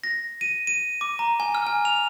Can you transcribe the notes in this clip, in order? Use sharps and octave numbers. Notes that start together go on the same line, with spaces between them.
A#6
D#7
D#7
D6
A#5
G#5
F6
G#5
F7